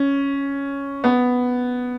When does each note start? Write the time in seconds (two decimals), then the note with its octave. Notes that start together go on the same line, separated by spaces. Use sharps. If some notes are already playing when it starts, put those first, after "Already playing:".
Already playing: C#4
1.04 B3